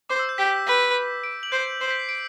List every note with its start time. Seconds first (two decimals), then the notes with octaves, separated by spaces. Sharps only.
0.09 C5 D6
0.19 E6
0.29 G6
0.38 G4 B6
0.67 B4
1.24 D7
1.43 F#7
1.52 C5 G6
1.81 C5
1.90 B6
1.99 C7
2.09 D7